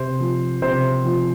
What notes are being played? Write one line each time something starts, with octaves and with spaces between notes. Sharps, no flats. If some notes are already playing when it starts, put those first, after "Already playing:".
Already playing: C3 C5
F3
C3 C5
F3